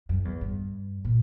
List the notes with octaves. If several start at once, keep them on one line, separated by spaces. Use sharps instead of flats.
F#2
E2
G2
A#2